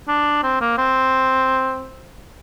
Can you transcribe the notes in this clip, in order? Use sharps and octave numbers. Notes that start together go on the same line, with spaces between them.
D4
C4
A#3
C4